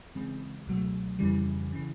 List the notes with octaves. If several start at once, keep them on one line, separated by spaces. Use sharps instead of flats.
C#3 E3 G#3 C4
C#2 B2 F#3 A3
F2 C#3 E3 G3
C#3 E3